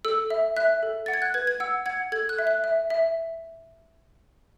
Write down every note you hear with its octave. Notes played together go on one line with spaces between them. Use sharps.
A4 E6
E5
E5 F#6
A4
F#5 A6
G#6
F#6
B4 G#6
G#6
F#5 E6
F#5 G#6
A4 G#6
F#6
E5
F#6
E5
E5